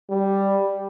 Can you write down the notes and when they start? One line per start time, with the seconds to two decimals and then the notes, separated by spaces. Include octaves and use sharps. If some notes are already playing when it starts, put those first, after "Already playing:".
0.10 G3